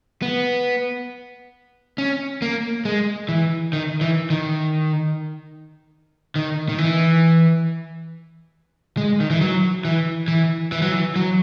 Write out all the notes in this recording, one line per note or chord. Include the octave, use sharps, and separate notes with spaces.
B3
C#4
A#3
G#3
E3
D#3
E3
D#3
D#3
D#3
E3
G#3
D#3
E3
F#3
E3
E3
E3
F#3
E3
F#3